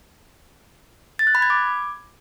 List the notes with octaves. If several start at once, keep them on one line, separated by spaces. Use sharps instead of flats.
A6
F#6
B5
G#6
D6